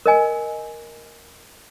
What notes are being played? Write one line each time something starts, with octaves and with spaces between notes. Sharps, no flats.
A#4 D#5 G#5